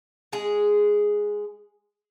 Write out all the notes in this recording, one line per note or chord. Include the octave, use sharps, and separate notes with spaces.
G#3 G#4